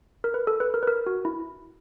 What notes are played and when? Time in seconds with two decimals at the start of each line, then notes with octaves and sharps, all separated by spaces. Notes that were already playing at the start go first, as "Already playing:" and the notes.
0.24 A#4
0.34 B4
0.47 A4
0.60 B4
0.74 A#4
0.83 B4
0.87 A#4
1.06 F#4
1.25 E4